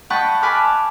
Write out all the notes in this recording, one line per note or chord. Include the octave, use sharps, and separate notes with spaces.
D#5 F#5 G5 A5 B5 C#6
G#5 A5 B5 D6 F6 F#6